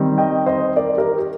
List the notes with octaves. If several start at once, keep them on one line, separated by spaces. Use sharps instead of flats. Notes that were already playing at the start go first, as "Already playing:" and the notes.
Already playing: D#3 G3 C4
D#5 G5
C5 D#5
A#4 D5
G4 A#4
G4